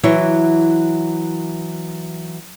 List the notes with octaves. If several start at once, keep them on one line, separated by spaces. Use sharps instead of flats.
E3 F#3 E4 C#5